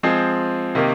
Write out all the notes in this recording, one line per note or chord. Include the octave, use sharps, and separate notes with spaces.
F3 G#3 C4 G#4
C3 D#3 A#3